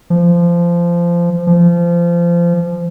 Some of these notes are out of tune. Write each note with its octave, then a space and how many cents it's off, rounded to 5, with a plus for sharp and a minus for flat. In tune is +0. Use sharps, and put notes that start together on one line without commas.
F3 -20
F3 -25